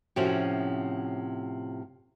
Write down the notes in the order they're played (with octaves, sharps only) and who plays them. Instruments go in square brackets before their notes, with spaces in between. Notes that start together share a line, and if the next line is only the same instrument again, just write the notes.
[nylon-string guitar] A2 C3 F3 C#4 F#4